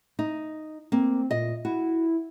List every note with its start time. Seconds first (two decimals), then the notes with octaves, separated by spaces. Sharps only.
0.19 D#4
0.92 A#3 C4
1.31 A#2 D#5
1.65 E4 F#4